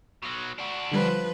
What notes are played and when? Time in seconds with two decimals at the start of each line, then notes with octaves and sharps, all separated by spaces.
0.23 B2 F#3
0.59 D4 F#4
0.92 D3 F3 G3 B4